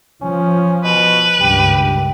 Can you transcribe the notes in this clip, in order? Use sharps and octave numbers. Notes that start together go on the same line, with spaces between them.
F3 C#4
B2 B4
C#2 G2 D#3 G4